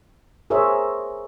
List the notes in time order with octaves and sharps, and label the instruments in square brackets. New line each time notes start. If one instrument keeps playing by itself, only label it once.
[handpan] G#4 A#4 C5 C#5 E5